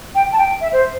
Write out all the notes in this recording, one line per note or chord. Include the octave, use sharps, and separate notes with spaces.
G5
A5
G5
E5
C5